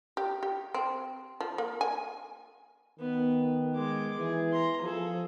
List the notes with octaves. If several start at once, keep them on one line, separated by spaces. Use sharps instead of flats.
G4
G4
C4
F3
A#3
G#5
D#3 B3
G#3 D6
E3 G#4
A#5 C6
F3 G#4 A4